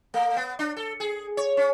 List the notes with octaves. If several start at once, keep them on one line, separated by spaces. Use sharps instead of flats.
A3
B3
D4
A4
G#4
C#5
C#4